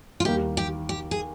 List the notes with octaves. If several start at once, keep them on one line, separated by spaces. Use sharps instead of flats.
F4
D#2 D#3 G3 A#3 G4
G4
G4
G#4